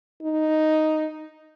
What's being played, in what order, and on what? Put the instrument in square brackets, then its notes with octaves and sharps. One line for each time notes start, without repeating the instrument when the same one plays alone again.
[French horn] D#4